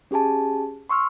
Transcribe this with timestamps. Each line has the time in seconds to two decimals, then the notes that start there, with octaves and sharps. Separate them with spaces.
0.11 C#4 G4 G#4 G#5 A5
0.90 C6 C#6 E6 F6